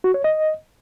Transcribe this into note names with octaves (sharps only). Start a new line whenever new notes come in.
F#4
C#5
D#5